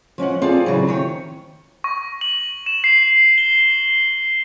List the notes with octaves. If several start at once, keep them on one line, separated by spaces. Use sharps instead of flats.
F3 C#4 D#5 F#5
C4 F4 G#4 A4 D5
C#3 E3 F#3
F2 D#3 C#5
C#6
F#7
E7
C7
G7